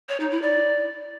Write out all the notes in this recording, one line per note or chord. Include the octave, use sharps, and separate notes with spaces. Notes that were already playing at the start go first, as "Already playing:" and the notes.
C#5
D#4
E4
D5